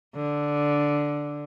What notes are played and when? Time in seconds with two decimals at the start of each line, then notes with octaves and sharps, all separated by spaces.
0.15 D3